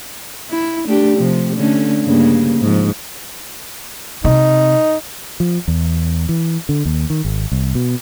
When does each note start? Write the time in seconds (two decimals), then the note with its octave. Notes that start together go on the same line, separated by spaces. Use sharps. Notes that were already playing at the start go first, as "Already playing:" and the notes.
0.50 E4
0.87 A3 D4 G4
1.17 C3 F3
1.56 D3 A3 C#4
2.04 G2 C#3 A#3
2.59 G#2 F3
4.24 C3 D#4
5.40 F3
5.68 E2
6.29 E3
6.69 D3
6.85 D#2
7.10 D#3
7.25 G#1
7.52 C2
7.75 B2